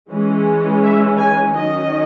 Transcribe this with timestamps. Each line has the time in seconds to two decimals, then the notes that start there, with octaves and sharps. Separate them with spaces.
0.10 E3 G#3 C#4
0.83 E5
1.18 G#5
1.55 D#3 F#3 C#4 D#5